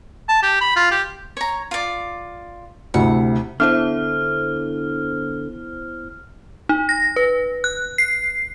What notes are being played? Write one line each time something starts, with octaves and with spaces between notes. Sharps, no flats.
A5
G4
B5
F4
G4
C#5 A#5
F4 D5
D2 C3 E4 F#5
D3 B3 E4 C5 E5 F6
D#4
A#6
B4
F#6
C7